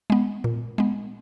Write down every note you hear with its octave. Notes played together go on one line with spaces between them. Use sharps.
G#3 B3
A#2
G#3 B3